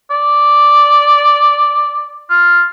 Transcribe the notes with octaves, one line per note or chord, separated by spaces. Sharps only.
D5
F4